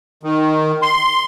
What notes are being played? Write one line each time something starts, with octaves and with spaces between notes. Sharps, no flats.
D#3
C6